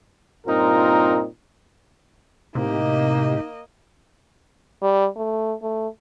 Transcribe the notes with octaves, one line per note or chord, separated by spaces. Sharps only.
G2 A#2 C4 D#4 F4 A#4
A2 C3 A#3 D#4 G4 D#5
G3
A3
A3